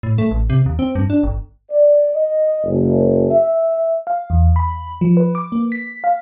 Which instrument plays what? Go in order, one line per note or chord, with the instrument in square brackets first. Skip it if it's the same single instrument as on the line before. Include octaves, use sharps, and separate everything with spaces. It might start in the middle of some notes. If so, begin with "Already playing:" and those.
[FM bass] A2
A3
A1
C3
D#2
C4
G2
D4
G1
[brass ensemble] D5
D#5
F#1
E5
[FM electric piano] F5
E2
B5
F3
B4
D6
A#3
B6
F5